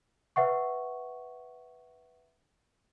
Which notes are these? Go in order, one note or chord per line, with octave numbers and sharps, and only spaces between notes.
B4 E5 F#5 C#6